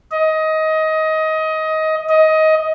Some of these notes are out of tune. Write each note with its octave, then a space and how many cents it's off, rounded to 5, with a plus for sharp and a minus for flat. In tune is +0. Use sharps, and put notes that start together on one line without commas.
D#5 +20
D#5 +20